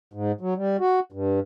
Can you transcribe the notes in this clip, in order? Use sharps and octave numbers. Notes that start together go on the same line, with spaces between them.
G#2
F#3
G3
F#4
G2